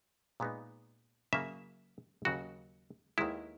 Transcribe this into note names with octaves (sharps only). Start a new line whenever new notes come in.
A#2 G#3 B3 D#4
C#3 F#3 A#3 E5
D#2 C#3 F#3 F#4
D#2 D#3 G#3 B3 E4